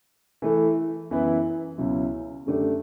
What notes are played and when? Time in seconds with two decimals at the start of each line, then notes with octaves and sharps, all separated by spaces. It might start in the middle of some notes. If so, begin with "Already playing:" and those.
0.42 E3 A3 E4 A4
1.10 F#2 E3 B3 E4 B4
1.78 C#2 B2 F#3 C#4 E4
2.46 F#2 D3 A3 D4 G4